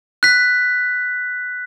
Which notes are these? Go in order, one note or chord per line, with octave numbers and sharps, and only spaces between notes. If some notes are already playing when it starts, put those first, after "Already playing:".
F#6 B6